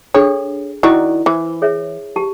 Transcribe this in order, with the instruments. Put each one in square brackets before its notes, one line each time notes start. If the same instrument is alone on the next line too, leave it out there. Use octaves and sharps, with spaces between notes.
[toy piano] D4 G#4 A4 [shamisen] C#5
[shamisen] D#3 F#4 D5 [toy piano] E4
[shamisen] E3 [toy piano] C5
[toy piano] G#4 C#5 E5
G4 A5